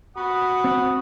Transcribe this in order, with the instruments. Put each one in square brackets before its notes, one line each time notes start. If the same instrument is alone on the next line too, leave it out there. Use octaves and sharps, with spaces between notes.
[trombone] F#4 [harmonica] F#5 B5 D#6
[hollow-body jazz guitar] C4